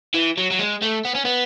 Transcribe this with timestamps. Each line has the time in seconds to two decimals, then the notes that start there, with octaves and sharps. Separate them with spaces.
0.14 E3
0.38 F#3
0.51 F#3
0.59 G#3
0.82 A3
1.05 B3
1.15 C#4
1.25 B3